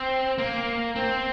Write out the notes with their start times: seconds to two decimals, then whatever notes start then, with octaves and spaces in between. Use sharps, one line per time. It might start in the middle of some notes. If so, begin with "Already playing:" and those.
Already playing: C4
0.38 A#3
0.96 C4